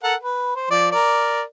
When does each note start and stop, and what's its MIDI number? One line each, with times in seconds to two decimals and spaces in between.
0.03 0.15 69
0.03 0.15 70
0.03 0.15 78
0.20 0.52 71
0.56 0.67 72
0.71 0.91 53
0.71 0.91 74
0.92 1.42 70
0.92 1.42 74